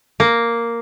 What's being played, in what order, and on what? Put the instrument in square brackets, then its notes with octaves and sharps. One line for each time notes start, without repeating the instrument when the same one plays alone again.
[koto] A#3